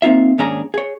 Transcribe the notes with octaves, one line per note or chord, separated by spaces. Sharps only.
A#3 C4 D#4 F4 E5
D#2 G#2 C#4 D4 G#4 A#5
G#4 C#5